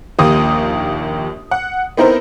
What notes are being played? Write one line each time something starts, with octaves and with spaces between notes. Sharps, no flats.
A#1 D#2 A#3 G4 D#6
F#5
B3 C4 D#4 E4 A#4 C5